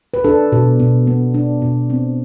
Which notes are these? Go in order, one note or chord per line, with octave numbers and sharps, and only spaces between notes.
B4
D4 A4
B2
B2
B3
D4
B2
C4